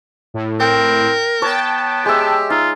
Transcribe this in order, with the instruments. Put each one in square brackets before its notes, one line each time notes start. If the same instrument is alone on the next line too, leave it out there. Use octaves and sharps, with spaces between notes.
[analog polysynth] A2
[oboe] C4 [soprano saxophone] A#4 [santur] G5
[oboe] B3 [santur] C#5 [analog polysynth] G5 A5
[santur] G#3 E5 [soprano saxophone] G4
[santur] D#4 [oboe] F4